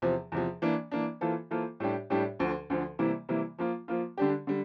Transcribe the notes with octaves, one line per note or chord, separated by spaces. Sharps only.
E2 C3 F3
E2 C3 F3
E3 A#3 D4
E3 A#3 D4
E3 A#3 F4 A4 C5
E3 A#3 F4 A4 C5
A2 G3 D4 G4
A2 G3 D4 G4
D2 D3 F3
D2 D3 F3
C3 E3 G3 A#3 E4
C3 E3 G3 A#3 E4
F3 A#3 F4
F3 A#3 F4
D3 G3 D4 G4
D3 G3